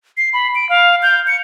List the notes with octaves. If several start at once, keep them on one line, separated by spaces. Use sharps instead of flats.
C7
B5
D7
F5
G6
C#7